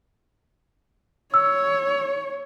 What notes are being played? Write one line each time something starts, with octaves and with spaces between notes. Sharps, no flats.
C#5 E6